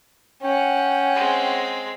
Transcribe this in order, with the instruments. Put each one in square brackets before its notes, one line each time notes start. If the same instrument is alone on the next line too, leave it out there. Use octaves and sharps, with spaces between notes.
[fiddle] C#4 F#5 [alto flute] G5
[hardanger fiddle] G#3 C4